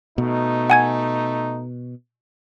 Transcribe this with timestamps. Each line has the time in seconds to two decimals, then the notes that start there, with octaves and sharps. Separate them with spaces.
0.18 B2 A3 D#4
0.70 F#5 G#5 G#6